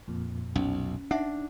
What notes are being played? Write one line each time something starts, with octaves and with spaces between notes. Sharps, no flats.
F2 A#2
B1 C#4
D4 D#4 E5 F#5